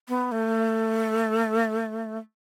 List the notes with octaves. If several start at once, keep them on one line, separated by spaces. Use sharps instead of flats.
B3
A3